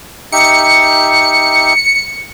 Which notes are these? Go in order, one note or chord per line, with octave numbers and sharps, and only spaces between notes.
D#4 G4 E5 C#7